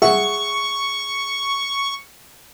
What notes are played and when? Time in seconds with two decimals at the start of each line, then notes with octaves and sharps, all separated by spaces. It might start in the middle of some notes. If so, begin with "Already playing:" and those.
0.02 G#4 E5 F#5 C#6